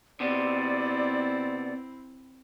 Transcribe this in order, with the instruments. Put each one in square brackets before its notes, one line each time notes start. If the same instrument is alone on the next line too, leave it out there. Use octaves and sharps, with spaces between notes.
[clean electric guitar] C3 B3 [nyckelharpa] C4 E4 [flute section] D5